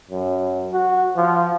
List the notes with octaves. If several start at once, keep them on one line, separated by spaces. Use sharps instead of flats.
F#2
F#4
F3